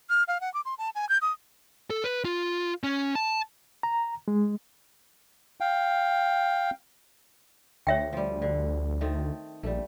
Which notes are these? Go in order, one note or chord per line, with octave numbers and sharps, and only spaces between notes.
F6
F5
F#5
D6
C6
A5
G#5
G6
D#6
A4
B4
F4
C#4
A5
A#5
G#3
F5 G5
D2 C#5 E5 G5
F3 G3
D3
D#3 A3 C4
A#1 G3 A3